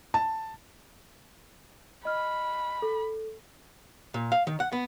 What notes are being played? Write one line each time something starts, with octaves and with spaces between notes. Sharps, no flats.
A5
D#5 B5 F6
A4
A#2
F5
D#3
F#5
B3